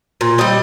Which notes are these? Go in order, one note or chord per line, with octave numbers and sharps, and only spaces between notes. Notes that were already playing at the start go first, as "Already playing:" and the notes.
A#2
G3 C4 D#5